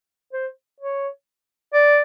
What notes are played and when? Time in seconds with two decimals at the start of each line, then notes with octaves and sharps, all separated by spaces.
0.33 C5
0.80 C#5
1.73 D5